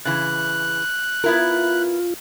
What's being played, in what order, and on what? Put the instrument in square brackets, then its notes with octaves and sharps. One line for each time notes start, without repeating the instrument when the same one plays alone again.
[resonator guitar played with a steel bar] C#3 E3 [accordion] F#6
[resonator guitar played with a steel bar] B3 E4 A#4 [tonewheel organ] F4